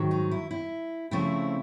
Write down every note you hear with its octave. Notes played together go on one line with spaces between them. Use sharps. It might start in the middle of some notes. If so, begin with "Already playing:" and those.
Already playing: G#2 D#3 F#3
D#4
E4
E4
C#3 F3 A3 C4 E4